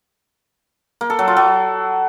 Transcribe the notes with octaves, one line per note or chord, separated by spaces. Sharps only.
A#3
A4
F#3
F4
F#3